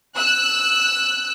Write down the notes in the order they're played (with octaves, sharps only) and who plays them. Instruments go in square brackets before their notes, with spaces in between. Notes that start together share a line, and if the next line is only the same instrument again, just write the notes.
[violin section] E6 F#6